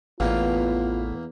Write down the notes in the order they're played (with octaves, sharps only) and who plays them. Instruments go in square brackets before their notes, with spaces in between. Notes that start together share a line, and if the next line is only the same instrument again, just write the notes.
[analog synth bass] A1 [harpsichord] E2 A#3 [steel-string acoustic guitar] A2 B3 F5 [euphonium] F4